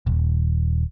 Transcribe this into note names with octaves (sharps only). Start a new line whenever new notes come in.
D#1